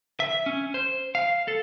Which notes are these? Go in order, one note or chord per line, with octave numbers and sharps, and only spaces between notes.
E5
C#4
C5
F5
A4